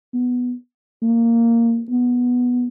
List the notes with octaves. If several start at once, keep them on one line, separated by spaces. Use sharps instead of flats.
B3
A#3
B3